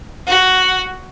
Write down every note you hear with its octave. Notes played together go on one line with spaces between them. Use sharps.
F#4